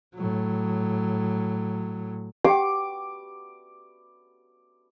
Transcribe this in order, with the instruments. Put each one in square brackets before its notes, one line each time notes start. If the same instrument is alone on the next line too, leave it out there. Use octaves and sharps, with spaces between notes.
[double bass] A2 F#3
[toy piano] G4 F#5 G5 [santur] D6